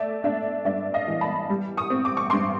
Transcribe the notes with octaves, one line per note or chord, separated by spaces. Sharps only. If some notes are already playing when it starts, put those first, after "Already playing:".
Already playing: A3 D5 E5
D4 D5 E5
G2 D5 E5
D#5 F5
E3
A5 B5
G3
C#6 D#6
C4
D6
C#6
G2 C6 D6